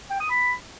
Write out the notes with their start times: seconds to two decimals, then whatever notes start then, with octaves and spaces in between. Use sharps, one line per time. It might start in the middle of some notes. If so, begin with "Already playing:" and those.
0.10 G5
0.20 D#6
0.30 B5